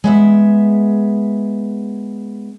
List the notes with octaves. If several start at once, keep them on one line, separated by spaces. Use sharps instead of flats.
G#3 B3 E5